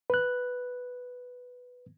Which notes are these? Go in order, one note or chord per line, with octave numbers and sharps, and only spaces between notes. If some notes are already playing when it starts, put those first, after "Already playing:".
B4 F#6